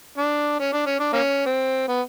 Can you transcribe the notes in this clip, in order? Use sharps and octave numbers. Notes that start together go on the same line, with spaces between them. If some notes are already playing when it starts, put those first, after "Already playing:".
D4
C#4
D4
C#4
D4
A#3 C#4
C4
B3